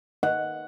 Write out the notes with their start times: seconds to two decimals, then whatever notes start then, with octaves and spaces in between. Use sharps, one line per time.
0.23 F#5